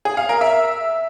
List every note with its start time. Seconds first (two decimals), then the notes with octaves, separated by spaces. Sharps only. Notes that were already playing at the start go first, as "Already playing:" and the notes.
0.05 G#4
0.17 F5
0.29 A#4
0.41 E5